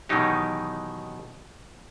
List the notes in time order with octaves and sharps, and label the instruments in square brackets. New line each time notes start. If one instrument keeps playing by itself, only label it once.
[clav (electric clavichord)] B2 D#3 E3 F#3 D#4 G4